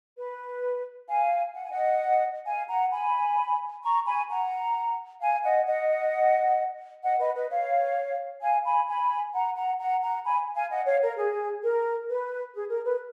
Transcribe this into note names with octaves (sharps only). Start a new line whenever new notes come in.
B4
F5 G#5
F#5
G#5
D#5 F#5
F5 G#5
F#5 A#5
G#5 B5
A#5 C#6
G#5 B5
F#5 A#5
F5 G#5
D#5 F#5
D#5 F#5
D#5 F#5
B4 D#5
B4 D#5
C#5 F5
F5 G#5
G#5 B5
G#5 B5
F#5 A#5
F#5 A#5
F#5 A#5
F#5 A#5
G#5 B5
F5 G#5
D#5 F#5
C#5 F5
A#4
G#4
A#4
B4
G#4
A#4
B4